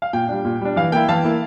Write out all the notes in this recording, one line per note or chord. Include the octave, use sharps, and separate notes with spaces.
F5
A#2 G5
G3 D4
A#2
G3 D4
E3 F5
A#3 E4 G5
E3 F5 A5
A#3 E4